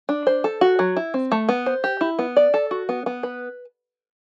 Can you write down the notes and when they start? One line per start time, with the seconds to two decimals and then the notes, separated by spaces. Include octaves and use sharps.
0.09 D4
0.27 C5
0.44 A4
0.61 F#4
0.79 F#3
0.97 E4
1.14 C4
1.32 A3
1.49 B3
1.66 C5
1.84 G4
2.01 E4
2.19 B3
2.37 D5
2.54 A4
2.71 F#4
2.89 B3
3.06 B3
3.23 B4